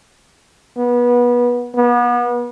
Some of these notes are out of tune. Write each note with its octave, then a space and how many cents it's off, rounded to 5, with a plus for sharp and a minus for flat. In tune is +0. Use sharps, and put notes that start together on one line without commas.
B3 -25
B3 -35